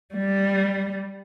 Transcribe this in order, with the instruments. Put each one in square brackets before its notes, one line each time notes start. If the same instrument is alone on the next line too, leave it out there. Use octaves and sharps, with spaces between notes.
[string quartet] G3